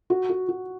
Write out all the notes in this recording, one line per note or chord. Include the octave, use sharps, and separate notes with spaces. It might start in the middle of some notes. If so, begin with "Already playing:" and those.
F#4
F#4
F#4